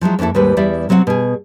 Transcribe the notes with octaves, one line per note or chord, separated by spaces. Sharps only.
F3 F#3 G#3 E4
F2 A#3 C#4 E4 A4
D#2 G#2 G3 G#3 B4
E2 G3 E4 D5 E5
C3 F#3 C4 D#5 F#5
B2 G#4